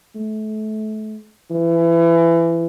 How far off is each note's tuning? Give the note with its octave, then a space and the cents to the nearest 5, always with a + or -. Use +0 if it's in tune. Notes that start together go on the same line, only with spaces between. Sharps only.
A3 -30
E3 +25